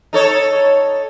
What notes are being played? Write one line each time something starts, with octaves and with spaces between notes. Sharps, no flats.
D#4 A4 C#5